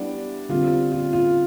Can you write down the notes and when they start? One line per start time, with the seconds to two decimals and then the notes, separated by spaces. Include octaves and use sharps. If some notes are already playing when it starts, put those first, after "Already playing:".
Already playing: G3 B3 D4 E4 G4
0.49 D3 G3 C4 F4
0.92 F4
1.13 F4